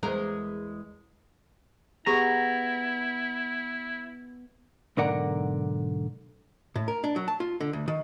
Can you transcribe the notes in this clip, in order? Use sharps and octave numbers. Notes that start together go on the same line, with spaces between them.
E2 G#3 A#4
B3 E4 G4 G#4 A#5 C#6
B1 G#2 D3 A#4 D5 F#5
A2
A#4
D4
F#3
A5
F4
D3
D2
D#3